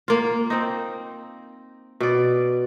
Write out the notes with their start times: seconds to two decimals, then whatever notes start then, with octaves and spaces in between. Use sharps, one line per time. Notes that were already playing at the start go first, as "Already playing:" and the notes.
0.08 A#3 F4
0.50 C4 D#4
2.00 B2 D5